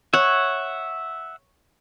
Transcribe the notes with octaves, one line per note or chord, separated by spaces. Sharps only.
C#5 E5 F#5